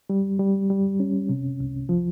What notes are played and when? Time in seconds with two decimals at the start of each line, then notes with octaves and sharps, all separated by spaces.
0.10 G3
0.39 G3
0.70 G3
1.00 C#4
1.29 C3
1.60 C2
1.89 F3